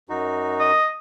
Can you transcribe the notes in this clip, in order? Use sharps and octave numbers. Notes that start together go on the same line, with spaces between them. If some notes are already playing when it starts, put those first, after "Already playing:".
F#2 D#4 F#4
D#5